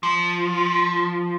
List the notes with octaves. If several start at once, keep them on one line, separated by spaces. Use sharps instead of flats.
F3